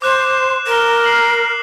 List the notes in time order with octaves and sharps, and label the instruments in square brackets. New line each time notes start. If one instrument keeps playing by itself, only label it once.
[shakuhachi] C5 [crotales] D6 F#6 E7
[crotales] D6 E7
[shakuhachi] A#4 [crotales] E7 G7
[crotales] C7 F#7